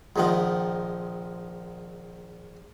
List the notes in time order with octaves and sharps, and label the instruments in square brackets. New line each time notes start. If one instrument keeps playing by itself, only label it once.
[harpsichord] A#1 G#2 D#3 F3 F#5